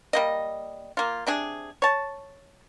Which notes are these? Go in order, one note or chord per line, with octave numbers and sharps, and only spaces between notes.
G3 A#3 D#5
A#3 F4
C3 D4 G#4
C#5 A5